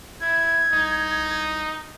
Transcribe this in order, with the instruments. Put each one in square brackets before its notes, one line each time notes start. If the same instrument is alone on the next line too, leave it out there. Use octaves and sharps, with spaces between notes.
[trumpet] E4 [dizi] G#6
[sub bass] C2 [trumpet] D#4